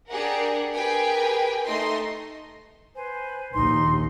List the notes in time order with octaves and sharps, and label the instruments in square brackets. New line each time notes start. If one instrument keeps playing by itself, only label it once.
[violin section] D4 G4 G#4 A#4 F#5
G4 G#4 A#4 B4 G5 G#5
A3 D#4 D#5 C6
[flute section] B4 C5 G#5
[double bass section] A#1 D#2 [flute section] D#4 C6